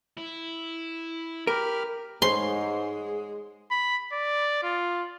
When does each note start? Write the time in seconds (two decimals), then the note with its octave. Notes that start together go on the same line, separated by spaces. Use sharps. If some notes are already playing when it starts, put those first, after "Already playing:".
0.17 E4
1.47 G4 A#4 B5 F6
2.22 G#2 G#3 G#4 C5 C#5 C6
3.71 B5
4.13 D5
4.63 F4